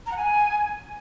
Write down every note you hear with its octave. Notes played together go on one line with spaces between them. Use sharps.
A#5
F#5
G#5